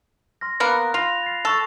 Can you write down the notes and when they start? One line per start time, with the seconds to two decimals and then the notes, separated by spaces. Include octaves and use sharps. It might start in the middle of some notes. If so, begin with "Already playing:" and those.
0.41 C6 F6 A#6
0.60 A#3 B3 A#4 F#6
0.94 F4 B5 A#6 F7
1.23 A6 C7
1.45 A4 A5 C#6 A6